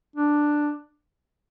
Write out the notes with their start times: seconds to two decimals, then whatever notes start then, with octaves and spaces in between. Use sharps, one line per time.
0.16 D4